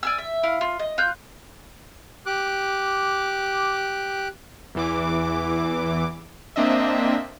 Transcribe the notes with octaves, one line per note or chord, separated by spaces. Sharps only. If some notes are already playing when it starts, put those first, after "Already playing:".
D5 G#5 E6
E5
E4 F5
F4
D#5
F4 F#6 G6
G4 D6 F#6
E2 E3 D6
A#3 C4 D4 D#5 E5